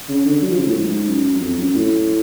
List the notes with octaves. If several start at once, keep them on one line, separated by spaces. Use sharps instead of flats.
C#3
D3
F#3
F3
C#3
A2
G#2
F#2
F#2
F2
F#2
A2